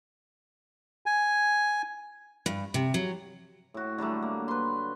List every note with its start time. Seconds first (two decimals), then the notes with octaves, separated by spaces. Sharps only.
1.06 G#5
2.46 G2
2.74 C3
2.94 F#3
3.74 A2 F#4
3.98 D3 F#3 G3 A3
4.22 A#3
4.48 B4 C6